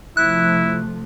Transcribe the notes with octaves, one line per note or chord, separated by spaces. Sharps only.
C3 F3 A3 E4 F#6